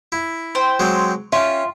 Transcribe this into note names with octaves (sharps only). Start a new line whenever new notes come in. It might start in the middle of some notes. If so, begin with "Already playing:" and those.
E4
C5 G5
F#3 G#3 C4
C#4 F4 E5 G5